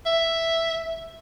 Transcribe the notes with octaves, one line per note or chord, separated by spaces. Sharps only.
E5